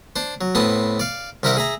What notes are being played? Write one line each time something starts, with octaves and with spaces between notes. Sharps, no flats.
D4 C5
F#3
A2 B3 C4 A5 C6 D#6
D5 F5
C2 G4 A#4 E5 F#5 G5
G#4 E5 A#5